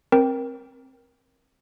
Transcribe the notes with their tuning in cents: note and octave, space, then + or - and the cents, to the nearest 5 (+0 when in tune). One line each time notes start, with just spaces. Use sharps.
C4 +20 A#4 +20 G5 +0